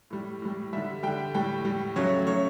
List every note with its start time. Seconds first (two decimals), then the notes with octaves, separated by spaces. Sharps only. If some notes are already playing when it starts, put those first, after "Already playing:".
0.10 A2 G3
0.42 A2 G3
0.73 D3 G3 E5
1.03 D3 G3 G5
1.34 A2 G3 G5
1.65 A2 G3
1.96 C#3 F#3 A3 C#5
2.27 C#3 F#3 A3 C#5